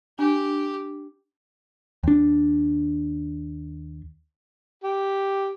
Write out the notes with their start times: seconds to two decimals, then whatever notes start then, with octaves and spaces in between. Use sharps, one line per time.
0.19 D4 G4
2.03 D#2 D4
4.84 G4